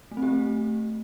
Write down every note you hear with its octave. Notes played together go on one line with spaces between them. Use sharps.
A3
C4
G4
A3